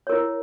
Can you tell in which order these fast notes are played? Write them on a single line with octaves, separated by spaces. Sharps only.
C#5 A#4 E4